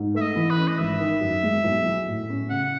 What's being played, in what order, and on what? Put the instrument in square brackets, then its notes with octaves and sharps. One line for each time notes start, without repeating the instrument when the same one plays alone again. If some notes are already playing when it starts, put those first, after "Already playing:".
Already playing: [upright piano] G#2
[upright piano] A3 [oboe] E5
[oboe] D#5
[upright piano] E3
[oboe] B4
[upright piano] C#4
[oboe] D#5
[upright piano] G#1 [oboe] E5
[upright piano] D#3
F#2
G#3
B1
F#3
A2
C#4
[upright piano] C#3 [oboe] F#5